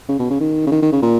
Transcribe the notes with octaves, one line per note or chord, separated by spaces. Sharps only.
C#3
B2
C#3
D#3
C#3
D#3
D#3
C#3
A#2